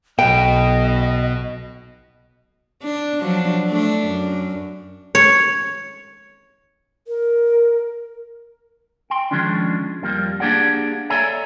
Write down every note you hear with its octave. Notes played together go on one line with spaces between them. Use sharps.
B1 B2 D#5 G5
D4
F3 F#3 D4
A3 D4
F#2
C#5
A#4
G5 C6
D#3 F3 G#3 C#4 D4
F2 F3 G3 A#3
A#3 D4 G4 G#4 D5 F#5
A4 C#5 D5 E5 G#5 A#5